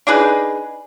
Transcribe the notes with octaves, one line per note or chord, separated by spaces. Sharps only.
D4 D#4 G#4 B4